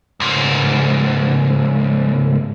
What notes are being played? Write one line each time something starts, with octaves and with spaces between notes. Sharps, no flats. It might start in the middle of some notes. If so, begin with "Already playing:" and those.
C#2 G#2